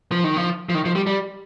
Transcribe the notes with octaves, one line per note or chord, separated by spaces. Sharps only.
F3
D#3
F3
F3
D#3
F3
G3
G3